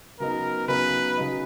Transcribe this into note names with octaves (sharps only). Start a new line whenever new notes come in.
C#3 F#3 B3 D#4 A#4
C#3 F#3 B3 D#4 B4
C#3 F#3 B3 D#4